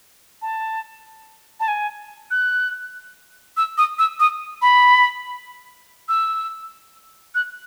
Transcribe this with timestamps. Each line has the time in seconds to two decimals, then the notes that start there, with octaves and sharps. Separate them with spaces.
0.42 A5
1.60 A5
1.68 G#5
2.31 F#6
3.57 E6
3.78 D#6
3.99 E6
4.20 D#6
4.62 B5
6.09 E6
7.35 F#6